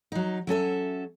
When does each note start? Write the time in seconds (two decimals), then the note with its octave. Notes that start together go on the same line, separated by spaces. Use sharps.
0.12 F#3 D#4
0.47 F#3 C#4 A4 E5